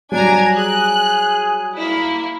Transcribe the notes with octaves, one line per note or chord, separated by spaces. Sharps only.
F#3 G3 D4 G#5 A#5
G#4 F#6
A#3 E4